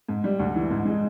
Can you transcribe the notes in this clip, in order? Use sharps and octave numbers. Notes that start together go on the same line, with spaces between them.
G#2
G3
D2
E3
G#2
G#3